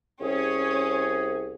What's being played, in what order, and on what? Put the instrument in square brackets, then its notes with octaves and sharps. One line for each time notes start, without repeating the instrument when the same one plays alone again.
[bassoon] C2 [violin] C#4 C#5 [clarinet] G#4